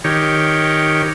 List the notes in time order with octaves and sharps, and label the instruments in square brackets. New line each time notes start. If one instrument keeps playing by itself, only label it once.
[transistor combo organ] D#3 G4 C#5